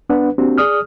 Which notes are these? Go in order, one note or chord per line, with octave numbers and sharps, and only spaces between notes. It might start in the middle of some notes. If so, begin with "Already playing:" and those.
B3 D4 B4 F#5
A#3 C4 D4 F#4 G4
G#4 D5 D#6 F6